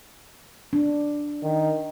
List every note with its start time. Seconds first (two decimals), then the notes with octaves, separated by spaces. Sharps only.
0.73 D4
1.43 D#3